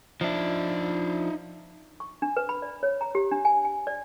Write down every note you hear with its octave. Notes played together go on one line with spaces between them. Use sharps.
F3 D4 D#4 E5
C#6
D4
B4
B5
D5
C#5
A#5
G4
D4
G#5
G#5
D5